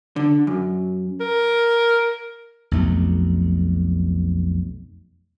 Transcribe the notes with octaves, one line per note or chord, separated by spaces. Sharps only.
D3
F#2
A#4
B1 F2 A3